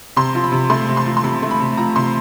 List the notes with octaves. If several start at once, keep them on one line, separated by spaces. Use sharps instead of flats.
C3 C6
F3
B5
C3
A3 C6
C3
C6
F3
C6
C3 B5
A3
B5
C3
F3 A#5
C3 C6